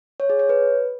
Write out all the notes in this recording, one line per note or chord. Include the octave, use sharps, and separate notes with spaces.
C#5
G#4
C#5
B4